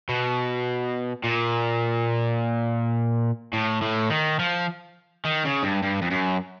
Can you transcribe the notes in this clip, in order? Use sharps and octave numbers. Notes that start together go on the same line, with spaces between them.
B2
A#2
A2
A2
D#3
F3
D#3
C#3
G2
G2
F2
F#2